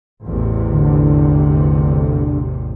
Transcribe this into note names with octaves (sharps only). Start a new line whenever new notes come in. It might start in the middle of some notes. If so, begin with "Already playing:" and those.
A1 E2 C3
D3